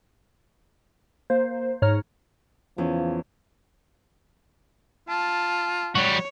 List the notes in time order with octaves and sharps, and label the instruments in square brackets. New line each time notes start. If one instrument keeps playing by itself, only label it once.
[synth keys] A#3 C5
G#2 C#5 A#5 F6
[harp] E2 C#4 [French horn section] C#3 F3
[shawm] F4 [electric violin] A5
[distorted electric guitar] G3 F#4 [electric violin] C#5